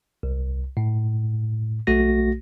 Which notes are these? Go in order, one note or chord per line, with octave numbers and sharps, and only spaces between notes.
C2
A2
B1 A3 F#4 A#6